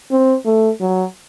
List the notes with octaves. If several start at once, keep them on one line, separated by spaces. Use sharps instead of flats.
C4
A3
F#3